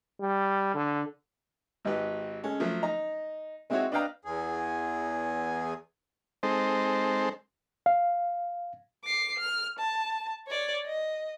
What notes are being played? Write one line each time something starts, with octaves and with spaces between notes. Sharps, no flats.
G3
D3
G#1 D#4 G4 B4
G#3 C#4 A4
F3 F#3 A3
D#4 A#5
G#3 C4 D#4 E4 F#4 C#5
D4 B4 D#5 F5 G5 A#5
E2 G#4
G#3 C4 D#4 A4 C5
F5
D6 C7
F6
A5
C#5 D5
D#5